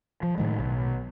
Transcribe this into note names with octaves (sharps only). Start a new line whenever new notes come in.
F3
A2 D#3 G#3
B1